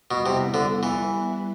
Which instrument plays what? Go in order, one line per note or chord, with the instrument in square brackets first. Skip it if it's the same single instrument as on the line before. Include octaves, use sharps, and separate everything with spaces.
[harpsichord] B2 [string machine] G3 B3 E4 B4
[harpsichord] C3
D3
E3